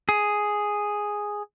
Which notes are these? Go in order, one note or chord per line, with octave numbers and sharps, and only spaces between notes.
G#4